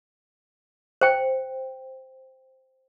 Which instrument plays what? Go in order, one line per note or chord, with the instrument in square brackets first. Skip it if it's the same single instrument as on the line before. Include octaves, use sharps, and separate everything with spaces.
[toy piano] C5 G5